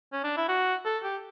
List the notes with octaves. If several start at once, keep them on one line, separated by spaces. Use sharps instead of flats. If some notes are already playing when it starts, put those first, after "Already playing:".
C#4
D4
E4
F#4
A4
G4